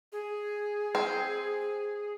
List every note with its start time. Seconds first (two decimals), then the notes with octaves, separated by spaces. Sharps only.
0.12 G#4
0.95 C4